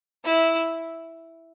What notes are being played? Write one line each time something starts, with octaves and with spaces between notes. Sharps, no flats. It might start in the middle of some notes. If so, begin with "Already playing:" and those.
E4